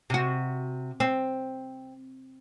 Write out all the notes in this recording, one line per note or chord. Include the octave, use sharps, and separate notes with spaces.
C3 F#4
C4